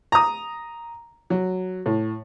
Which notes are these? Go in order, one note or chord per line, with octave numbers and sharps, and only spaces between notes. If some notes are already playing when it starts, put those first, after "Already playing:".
A#5 D#6
F#3
A2